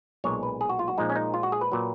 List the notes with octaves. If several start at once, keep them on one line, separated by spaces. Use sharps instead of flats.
B1 A#2 G#3 C#5
B4
G#4
F#4
F4
F#4
A#1 A#2 F3 G#3 D#4
C#4
D#4
F4
F#4
G#4
B4
A#2 F#3